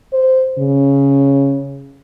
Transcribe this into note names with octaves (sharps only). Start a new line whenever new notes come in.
C5
C#3